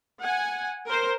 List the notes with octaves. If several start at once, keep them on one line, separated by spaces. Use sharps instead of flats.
F#5 G#5
A#4 C5